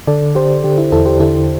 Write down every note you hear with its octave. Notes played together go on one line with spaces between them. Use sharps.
D3 A4 D5
D3 G4 C5
D3 G4
E4
E2 E4 A4
G4 C5
D3 E4 A4